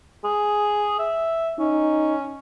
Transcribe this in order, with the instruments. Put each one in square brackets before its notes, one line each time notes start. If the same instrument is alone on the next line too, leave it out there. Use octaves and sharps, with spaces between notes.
[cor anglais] G#4
E5
[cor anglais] C#4 [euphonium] D#4